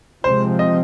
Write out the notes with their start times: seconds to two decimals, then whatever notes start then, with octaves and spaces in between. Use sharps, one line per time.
0.24 C3 F3 G#3 C4 C5
0.59 D#5